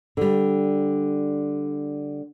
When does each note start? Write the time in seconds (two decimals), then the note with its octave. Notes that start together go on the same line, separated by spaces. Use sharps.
0.17 D3 G3